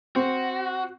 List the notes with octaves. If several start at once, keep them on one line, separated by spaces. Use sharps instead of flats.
C4 F#4